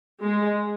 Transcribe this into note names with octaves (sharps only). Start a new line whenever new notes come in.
G#3